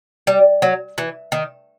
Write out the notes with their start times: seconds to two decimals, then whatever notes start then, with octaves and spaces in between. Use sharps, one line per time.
0.27 G3
0.62 F#3
0.98 E3
1.32 D#3